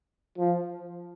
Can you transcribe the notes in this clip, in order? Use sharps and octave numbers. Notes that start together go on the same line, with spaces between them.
F3